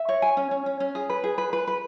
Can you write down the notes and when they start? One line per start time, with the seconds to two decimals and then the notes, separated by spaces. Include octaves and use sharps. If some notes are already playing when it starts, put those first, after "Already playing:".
Already playing: E5
0.09 C#5
0.22 G#5
0.37 C#4
0.51 C#4
0.66 C#4
0.80 C#4
0.95 G#4
1.09 B4
1.24 G#4
1.38 B4
1.53 B4
1.67 B4